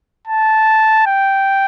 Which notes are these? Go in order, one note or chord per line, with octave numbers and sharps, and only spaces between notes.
A5
G5